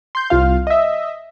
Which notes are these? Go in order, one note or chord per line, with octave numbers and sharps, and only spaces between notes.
C6 G6
C2 F4 F5
D#5 E5